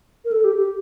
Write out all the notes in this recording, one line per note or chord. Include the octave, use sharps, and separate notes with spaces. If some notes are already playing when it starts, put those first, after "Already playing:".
A#4
A4
G4
G4